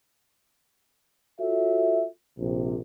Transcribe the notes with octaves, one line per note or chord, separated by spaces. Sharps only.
F4 F#4 A4 C#5 E5
A#1 C3